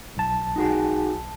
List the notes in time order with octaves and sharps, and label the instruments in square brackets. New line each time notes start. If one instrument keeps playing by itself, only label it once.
[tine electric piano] B1 A5
[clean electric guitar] D#4 F#4 G#4